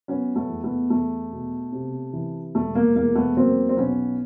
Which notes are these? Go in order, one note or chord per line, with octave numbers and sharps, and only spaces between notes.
F#3 B3 C#4
A3 B3
E2
A3 B3
E2 A3
B2
C3
E3
E1 A3
A#3
E2 A#3
A3 B3
F#3 A#3 C4
C4
B1 B3 C#4